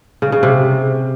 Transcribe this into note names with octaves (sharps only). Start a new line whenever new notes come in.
C#3
C#3
C3